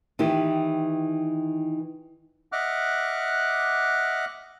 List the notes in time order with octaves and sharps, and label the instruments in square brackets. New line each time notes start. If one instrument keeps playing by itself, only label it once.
[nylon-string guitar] D#3 E3 E4 G4
[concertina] D#5 E5 F#5 D6 F6 F#6